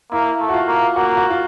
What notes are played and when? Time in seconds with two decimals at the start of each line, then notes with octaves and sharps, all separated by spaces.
0.12 A#3 E4
0.40 A3
0.49 F#4
0.54 F4
0.68 A#3
0.96 A#3 F#4
1.17 F#4
1.31 F4